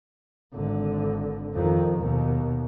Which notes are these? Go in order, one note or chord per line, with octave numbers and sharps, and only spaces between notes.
G#1 D3
F2 D#3
D#2 B2